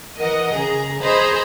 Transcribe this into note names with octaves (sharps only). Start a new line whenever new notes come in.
E3 A#4 D#5 F#5
C#3 G#4 A#5
G#4 C5 D#5 A#5 B5